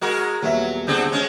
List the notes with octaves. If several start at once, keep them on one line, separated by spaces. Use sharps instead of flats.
G#3 F#4 A#4
D#1 F#3 B3 E5
D3 C4 G#4
G#3 C#4